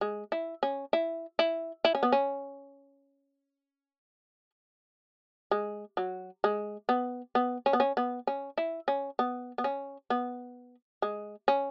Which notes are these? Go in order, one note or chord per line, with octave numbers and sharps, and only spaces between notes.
G#3
E4
C#4
E4
E4
E4
C#4
B3
C#4
G#3
F#3
G#3
B3
B3
C#4
B3
C#4
B3
C#4
E4
C#4
B3
B3
C#4
B3
G#3
C#4